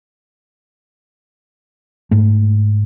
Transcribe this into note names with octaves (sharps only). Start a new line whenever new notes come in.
G#2 A3